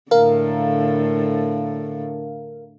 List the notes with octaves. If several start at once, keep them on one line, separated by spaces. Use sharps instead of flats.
A2 D3 A#4 F5